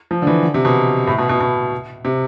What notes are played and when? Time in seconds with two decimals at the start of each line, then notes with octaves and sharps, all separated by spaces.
0.11 F3
0.22 D3
0.27 E3
0.43 D3
0.54 C3
0.65 B2
1.07 A2
1.18 B2
1.29 B2
1.40 B2
2.05 C3